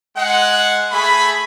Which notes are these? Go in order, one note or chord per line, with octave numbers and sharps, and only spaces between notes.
G#3 F#5
A3 G#4 B5